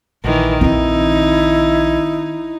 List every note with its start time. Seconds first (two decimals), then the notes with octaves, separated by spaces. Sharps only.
0.24 A#1 D#3 E3
0.61 D#3 C4 D#4 E4